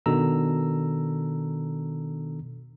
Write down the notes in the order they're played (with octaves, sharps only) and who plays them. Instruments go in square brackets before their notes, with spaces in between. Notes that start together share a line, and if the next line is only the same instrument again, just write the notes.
[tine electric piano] B2 D#3 D4 A4 A#5 E6